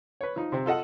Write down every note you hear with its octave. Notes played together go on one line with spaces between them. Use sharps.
B4 C#5
F3 D#4
C3 C4
F4 A4 D#5 F#5